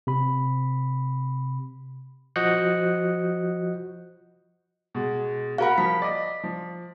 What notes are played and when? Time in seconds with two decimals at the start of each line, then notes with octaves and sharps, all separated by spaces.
0.07 C3 B5
2.36 F3 F#4 D#5 F#6 G6 C#7
4.95 B2 G#3
5.58 F#4 A#4 F5 F#5 B5
5.78 F3 B6
6.02 D5 D#5
6.44 F3